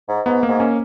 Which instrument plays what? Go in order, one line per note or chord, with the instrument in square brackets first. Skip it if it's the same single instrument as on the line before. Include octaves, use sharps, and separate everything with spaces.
[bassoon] G#2
[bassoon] G#2 [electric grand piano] B3
[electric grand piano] A#3
[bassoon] G#2
[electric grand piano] A#3 C#4